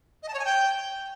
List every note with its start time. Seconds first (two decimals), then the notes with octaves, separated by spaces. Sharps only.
0.23 D#5
0.28 A5
0.34 C#5
0.39 G#5
0.45 G5